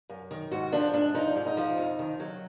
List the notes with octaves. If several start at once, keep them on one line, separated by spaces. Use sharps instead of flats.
F#2
D#3
G#2 F#4
F3 D4
G#2 D4
F3 D#4
G#2
D#4
F3
F2
D#3
F#3